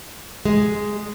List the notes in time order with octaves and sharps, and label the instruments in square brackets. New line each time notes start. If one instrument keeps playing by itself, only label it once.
[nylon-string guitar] G#3